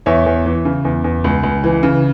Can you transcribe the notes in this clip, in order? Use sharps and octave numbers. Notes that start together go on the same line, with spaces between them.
E2 C#5 E5
E2
E3
C#3
E2
E2
C#2
C#2
E3
C#3